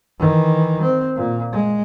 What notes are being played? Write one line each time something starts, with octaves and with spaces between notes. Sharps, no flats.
D#3 E3
C4
A#2
G#3